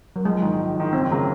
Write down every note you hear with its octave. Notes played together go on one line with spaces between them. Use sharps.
F#3
A#1 G#3
G#2 D#3
A#1
G#2 D#3
F#1 C4
C#3 F#3 A#3